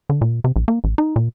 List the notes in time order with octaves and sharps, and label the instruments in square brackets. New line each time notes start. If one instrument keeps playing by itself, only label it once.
[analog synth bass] D3
A#2
C3
A#1
A#3
A1
D#4
A#2